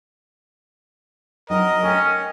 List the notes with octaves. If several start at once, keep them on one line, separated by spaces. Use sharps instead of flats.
F#3 C4 D#4 A#4 D#5
C#4 A4 A#4 G5